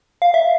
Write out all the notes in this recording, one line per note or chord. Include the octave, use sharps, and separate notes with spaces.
F5
E5